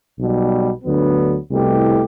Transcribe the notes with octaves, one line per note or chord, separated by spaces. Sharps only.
B1 B2 G3
D2 D3 F#3 B3
C2 B2 A3 E4 G4